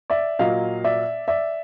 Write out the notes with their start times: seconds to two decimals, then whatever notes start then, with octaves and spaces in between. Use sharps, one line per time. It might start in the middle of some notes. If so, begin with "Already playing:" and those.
0.10 D5 E5
0.39 A#2 F#3 A#3 D#5 F5
0.84 D5 E5
1.28 D5 E5